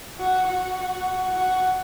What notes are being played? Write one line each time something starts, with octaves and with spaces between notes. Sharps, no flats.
F#4
F#4
F#4